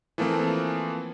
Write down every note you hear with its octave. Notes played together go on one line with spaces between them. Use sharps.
E3 F3 A3 A#3 C4